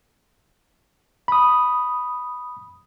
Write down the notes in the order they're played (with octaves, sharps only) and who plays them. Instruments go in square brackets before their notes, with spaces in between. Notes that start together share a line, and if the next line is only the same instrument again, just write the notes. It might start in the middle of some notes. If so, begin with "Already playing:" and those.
[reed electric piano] B5 D#6